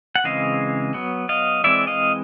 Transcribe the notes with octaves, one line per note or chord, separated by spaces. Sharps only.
F#5
C#3 E3 G#3 C4 D#5 F5
F#3 B3
D#5 F5
E3 G#3 C4 D5 E5
D#5 F5